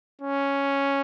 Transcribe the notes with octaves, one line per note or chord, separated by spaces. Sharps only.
C#4